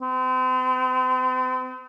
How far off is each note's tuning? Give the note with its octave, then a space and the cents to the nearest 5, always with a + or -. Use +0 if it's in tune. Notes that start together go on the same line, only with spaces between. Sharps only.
C4 -40